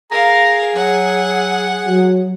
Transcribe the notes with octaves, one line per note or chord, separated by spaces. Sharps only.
G#4 A#4 F5 A#5
F#3 F#5
F#3